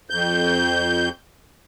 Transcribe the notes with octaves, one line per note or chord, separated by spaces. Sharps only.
F2 G6